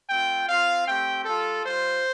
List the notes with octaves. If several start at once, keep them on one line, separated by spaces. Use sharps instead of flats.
A3 C4 F4 G5
C4 F4 F5
A3 C4 G4 G5
G3 F4 A4
G3 F4 C5